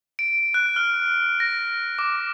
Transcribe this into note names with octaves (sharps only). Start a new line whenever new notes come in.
D7
F#6
F6
A#6
D6